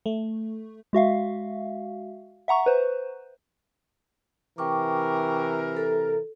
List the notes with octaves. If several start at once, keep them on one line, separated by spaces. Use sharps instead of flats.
A3
G#3 F#4 E5 F5
E5 F#5 A#5 C#6
B4 C5
C3 E3 A#4 G5 C#6 D6
A4